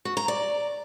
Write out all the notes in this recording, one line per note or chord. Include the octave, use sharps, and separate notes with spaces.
F#4
A#5
D5